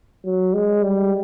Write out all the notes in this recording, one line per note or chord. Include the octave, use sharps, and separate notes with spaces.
F#3
G#3
G3